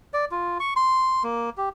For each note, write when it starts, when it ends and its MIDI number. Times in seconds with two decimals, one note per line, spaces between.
0.14 0.25 74
0.31 0.58 65
0.60 0.74 85
0.76 1.23 84
1.24 1.50 58
1.57 1.69 67